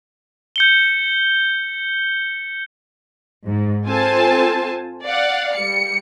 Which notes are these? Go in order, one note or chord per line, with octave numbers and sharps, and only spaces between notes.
G6 C#7 G7
G#2
C4 F4 A4 C5 G#5 A5
D5 F5 F#5
G3 C#7